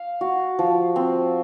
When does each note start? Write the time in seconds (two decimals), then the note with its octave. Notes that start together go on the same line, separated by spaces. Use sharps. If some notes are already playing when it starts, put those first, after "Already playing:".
Already playing: F5
0.21 F#4
0.59 F3
0.96 C4